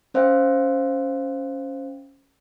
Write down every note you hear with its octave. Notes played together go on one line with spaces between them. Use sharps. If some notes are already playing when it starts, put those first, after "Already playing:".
C#4 C5 E5 F5 G5